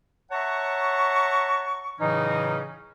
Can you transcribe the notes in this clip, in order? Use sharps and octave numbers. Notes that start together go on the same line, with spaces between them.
C#5 E5 F#5 A5 A#5 C#6
A2 C#3 E3 F#3 C#4 D#4